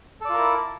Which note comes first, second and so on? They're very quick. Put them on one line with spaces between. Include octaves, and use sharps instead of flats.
A4 D5 F4 A#4 E4